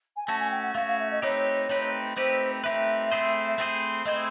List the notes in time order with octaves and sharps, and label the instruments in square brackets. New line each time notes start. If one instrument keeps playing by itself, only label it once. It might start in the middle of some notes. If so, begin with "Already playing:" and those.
[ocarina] G#5
[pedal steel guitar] A3 C#4 F#4 [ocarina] A5
[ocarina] G#5
G5
F#5
[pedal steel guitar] A3 C#4 F#4 [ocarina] F5
[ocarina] F5
E5
D#5
[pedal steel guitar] A3 C4 D#4 G4 B4 [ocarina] C#5
[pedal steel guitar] A3 C4 D#4 G4 B4
[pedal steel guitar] A3 C4 D#4 G4 B4 [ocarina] C5
[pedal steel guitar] A3 C4 D#4 G4 B4 [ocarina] E5
[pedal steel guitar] A3 C4 E4 G#4 C5
A3 C4 E4 G#4 C5
[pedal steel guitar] A3 C4 E4 G#4 C5 [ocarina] D#5